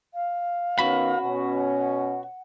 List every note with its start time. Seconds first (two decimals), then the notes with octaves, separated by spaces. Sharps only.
0.14 F5
0.79 D#3 B3 C#4 F#4 B5
1.22 B2 C#4 F#5